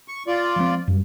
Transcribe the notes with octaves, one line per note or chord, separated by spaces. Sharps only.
C#6
F4 D5
F3 G#3 C4
F#2 G3